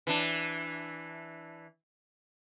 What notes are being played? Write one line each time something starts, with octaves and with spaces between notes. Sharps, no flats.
E3 D4